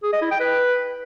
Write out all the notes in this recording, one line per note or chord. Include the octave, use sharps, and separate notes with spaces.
G#4
D#5
E4
G5
B4